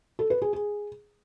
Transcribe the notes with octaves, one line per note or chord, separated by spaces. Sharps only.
A4
B4
G#4
G#4